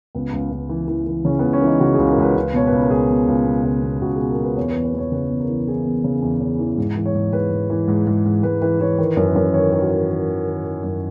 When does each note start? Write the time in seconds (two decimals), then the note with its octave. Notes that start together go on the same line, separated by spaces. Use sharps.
0.15 C#2 B3
0.33 C#2
0.51 C#2
0.69 E3
0.88 E3
1.07 E3
1.25 C#3 C#4
1.39 C#2 B3
1.53 C#4
1.62 E3
1.67 D#4
1.80 C#3 F#4
1.94 C#2 G#4
2.09 A#4
2.18 C#2 B4
2.35 C#2
2.54 B2 C#5
2.67 B4
2.72 C#2
2.80 A#4
2.90 C#2 G#4
3.10 B2
3.28 C#2
3.46 B2
3.64 C#2
3.83 B2
4.01 C#2 F#4
4.15 B2 G#4
4.30 A#4
4.38 B2
4.43 B4
4.56 E2 C#5
4.70 B4
4.76 E2
4.84 B4
4.94 E2 C#5
5.11 C#3 B4
5.30 E2
5.40 A#4
5.49 E3
5.67 E3 G#4
5.86 E2
6.04 C#3
6.22 E2
6.41 C#3
6.59 E3
6.78 G#2
6.96 E3
7.06 C#5
7.14 G#2
7.33 G#2 B4
7.51 G#2
7.70 E3
7.88 G#2
8.07 G#2
8.25 G#2
8.43 G#2 B4
8.62 E3 B4
8.80 E3 C#5
8.98 D#3 B4
9.17 F#2
9.26 B4
9.36 F#2
9.54 D#3 C#5
9.73 D#3
9.82 F#4
9.91 D#3
10.10 D#3
10.28 D#3
10.47 D#3
10.64 D#3
10.84 F#2